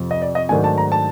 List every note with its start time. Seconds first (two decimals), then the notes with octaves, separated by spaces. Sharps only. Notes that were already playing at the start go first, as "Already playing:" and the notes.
Already playing: F2 C3 F3
0.11 D#5
0.22 D5
0.35 D#5
0.49 G#2 D#3 F#3 A3 D4 G#5
0.64 A5
0.78 A#5
0.92 A5